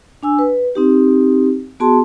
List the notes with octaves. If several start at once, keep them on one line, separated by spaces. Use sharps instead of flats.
D4 G#5 E6
B4
C4 D#4 G4
B3 F#4 G#4 A5 C6